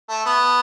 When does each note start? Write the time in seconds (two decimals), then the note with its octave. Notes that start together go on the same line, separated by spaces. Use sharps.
0.09 A3
0.26 B3